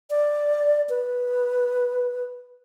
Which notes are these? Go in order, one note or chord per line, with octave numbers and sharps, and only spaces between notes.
D5
B4